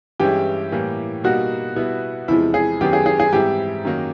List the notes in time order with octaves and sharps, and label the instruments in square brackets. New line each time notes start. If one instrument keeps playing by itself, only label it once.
[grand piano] G2 E3 G#3 C#4 E4 [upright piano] G4
[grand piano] A2 E3 G3 A#3
[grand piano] B2 G3 A#3 D#4 [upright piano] F#4
[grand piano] B2 G3 B3 E4
[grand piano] E2 C3 F3 G#3 [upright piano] E4
[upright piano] G#4
[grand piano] F#2 D#3 F#3 B3 [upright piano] G4
[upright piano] G#4
G#4
G#4
[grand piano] G#2 E3 G3 C4 E4 [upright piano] G4
[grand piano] F#2 D#3 F#3 A#3